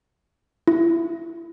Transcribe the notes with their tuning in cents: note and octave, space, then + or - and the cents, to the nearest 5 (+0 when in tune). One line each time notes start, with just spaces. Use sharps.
E4 +20